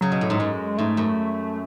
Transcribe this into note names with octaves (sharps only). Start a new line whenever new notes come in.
C#3 F#3
B2
A2
G#2
F#2 G#3
G#2 A3
F#2